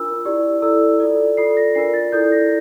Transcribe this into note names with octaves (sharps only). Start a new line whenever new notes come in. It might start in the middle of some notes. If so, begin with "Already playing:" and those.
Already playing: D4 F4 A#4 E6
E4 G4 D5
E4 A4 D5 E6
F4 A4 D5
F4 A4 D5 C7
A#6
D4 F4 A#4 D5 C7
A6
E4 A4 D5 G6
A#6